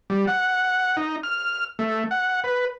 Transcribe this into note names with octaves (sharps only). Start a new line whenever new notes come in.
G3
F#5
D#4
F6
A3
F#5
B4